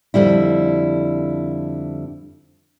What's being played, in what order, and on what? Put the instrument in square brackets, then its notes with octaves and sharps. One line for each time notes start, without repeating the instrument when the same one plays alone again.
[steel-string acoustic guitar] F2 G#2 D3 G3 E4